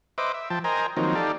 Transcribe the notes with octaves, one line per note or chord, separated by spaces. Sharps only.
B4 C5 D#5 E5 D6
E5
F3 G5 A5
A#4 C5 D#5 G5 G#5 A#5
D#3 F3 F#3 A#3 C4 D#4
D#4 G4 A4 D5 F5